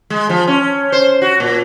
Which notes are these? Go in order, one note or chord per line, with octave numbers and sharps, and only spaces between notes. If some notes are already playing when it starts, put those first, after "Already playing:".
G#3
F3
C#4
C5
F#4
A#2